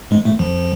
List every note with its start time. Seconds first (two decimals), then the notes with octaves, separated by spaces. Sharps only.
0.11 G#2 G#3
0.25 A2 A3
0.39 F2 F3